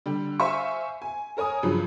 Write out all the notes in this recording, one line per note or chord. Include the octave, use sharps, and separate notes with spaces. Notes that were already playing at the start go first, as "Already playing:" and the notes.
D3 G3
C5 E5 F5 G#5 C#6
G#5
A4 A#4 C#5 G#5 D#6
G2 C#3 F3 F#3